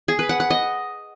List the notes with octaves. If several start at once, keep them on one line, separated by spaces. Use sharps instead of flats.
G#4
B4
F#5
F#5
D#5